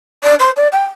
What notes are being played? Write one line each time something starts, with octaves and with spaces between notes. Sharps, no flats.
D5
C5
D5
G5